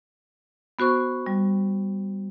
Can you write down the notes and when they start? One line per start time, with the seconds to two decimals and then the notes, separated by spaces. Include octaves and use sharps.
0.79 B3 F#4 C5 C#6
1.26 G3